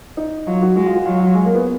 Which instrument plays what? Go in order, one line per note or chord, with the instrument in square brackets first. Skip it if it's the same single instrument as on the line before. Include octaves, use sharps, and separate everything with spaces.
[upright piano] D#4
[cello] F#3 [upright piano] F4
[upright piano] F#4
[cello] G#3 [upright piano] F#4
[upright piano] F4
F#4
[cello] F#3 [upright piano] F4
[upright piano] F4
G#3
A#3
B3